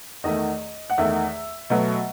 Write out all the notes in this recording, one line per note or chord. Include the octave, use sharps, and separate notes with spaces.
E2 D#3 A3 D#5
F#5
E2 D#3 A3 E5
B2 F#3 A3